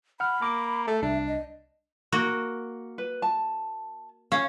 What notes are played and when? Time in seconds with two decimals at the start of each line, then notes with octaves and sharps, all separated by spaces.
0.20 F#5 B5 F6
0.42 A#3 A#5 D6
0.87 A3 E5
1.02 C2 D4 E5
1.28 D#5
2.12 A#3 F#4
2.98 B4
3.22 A5
4.32 C#4 F5